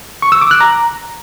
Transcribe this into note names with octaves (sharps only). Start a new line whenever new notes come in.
C#6
E6
D6
F#6
A#5